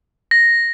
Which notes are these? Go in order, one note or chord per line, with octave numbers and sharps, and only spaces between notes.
A#6